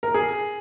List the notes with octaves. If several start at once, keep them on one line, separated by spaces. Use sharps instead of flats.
A#4
G#4